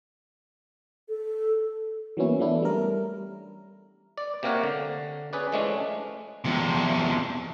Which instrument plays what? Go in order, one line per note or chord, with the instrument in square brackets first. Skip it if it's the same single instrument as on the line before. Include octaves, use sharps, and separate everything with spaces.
[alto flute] A4
[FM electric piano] E3 F#3 A#3 B3 C#4 E4
E3 A3 B3 D4 E4
G3 A#4
[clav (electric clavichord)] D5
C3 A#3 G4 A#4 C#5 F#5
D3
C#4 G#4 B4 D5
E3 F3 G#3 A3 C#4 D4
[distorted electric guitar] E2 C3